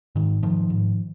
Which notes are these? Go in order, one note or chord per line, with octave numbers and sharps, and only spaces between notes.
G#2 D#3
G#2 D#3 F3
G#2